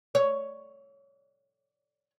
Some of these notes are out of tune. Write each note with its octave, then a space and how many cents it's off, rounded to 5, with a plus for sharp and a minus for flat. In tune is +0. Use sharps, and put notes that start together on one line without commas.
C#5 +5